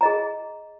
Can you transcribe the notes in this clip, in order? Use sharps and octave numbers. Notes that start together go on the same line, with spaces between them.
G#4 D#5 A#5